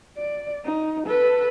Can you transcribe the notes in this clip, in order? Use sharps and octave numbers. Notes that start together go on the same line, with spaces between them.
D5
D#4
A4 B4